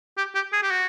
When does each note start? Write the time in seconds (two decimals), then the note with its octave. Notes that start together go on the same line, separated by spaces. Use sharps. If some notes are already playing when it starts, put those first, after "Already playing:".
0.18 G4
0.35 G4
0.53 G#4
0.63 G4
0.71 F#4